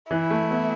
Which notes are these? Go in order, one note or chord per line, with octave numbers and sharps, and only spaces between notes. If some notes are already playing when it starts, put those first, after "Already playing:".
E3 E4
A3
B3